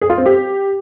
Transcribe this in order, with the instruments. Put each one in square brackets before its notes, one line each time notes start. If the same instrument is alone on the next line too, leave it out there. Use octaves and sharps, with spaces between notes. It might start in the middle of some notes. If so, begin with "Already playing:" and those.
[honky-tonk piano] G#4
F4
C4
G4